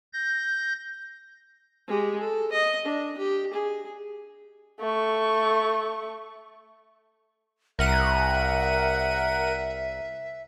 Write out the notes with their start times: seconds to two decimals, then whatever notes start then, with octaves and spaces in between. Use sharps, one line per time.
0.13 G6 A#6
1.88 G#3 G4
2.20 A4
2.52 D#5
2.85 D4
3.18 G4
3.53 G#4
4.80 A3 C#6
7.79 C2 A#4 E5 F#5 D#7